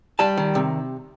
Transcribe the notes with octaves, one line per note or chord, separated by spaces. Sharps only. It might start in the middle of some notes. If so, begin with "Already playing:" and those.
G3 A5
D#3
C3